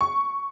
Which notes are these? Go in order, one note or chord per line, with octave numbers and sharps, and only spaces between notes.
C#6